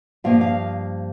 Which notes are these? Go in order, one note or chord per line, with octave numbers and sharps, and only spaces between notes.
G2 F3 A#3 F5
F5